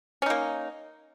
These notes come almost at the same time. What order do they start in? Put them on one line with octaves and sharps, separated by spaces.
C#4 D#4 A#3